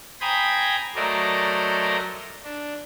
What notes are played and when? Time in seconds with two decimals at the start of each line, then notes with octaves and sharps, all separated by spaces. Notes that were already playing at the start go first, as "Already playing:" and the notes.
0.21 C5 G5 G#5 A#5 B5 D#6
0.95 F#3 A3 A#4 C5 D5 D#5
2.44 D4